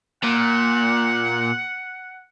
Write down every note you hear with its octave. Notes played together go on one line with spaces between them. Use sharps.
A#2 F#5